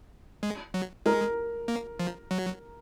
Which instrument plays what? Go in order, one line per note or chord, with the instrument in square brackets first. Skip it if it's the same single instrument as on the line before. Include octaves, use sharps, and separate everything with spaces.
[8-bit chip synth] G#3
F#3
[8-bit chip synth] G#3 [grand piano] A#4
[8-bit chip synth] A#3
F3
F#3